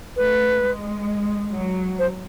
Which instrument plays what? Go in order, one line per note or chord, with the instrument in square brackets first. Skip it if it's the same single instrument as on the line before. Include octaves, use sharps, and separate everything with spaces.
[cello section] A3 [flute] B4
[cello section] G#3
F#3
[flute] C5